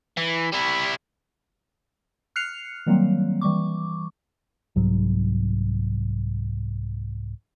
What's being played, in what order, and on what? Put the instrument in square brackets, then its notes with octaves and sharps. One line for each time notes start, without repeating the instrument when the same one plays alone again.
[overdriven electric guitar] E3
G3 E4
[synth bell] F6 F#6 C7 C#7 F7
D#3 F#3 G3 A#3 C4
E3 G3 C#6 D6
[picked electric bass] C2 G#2 F#3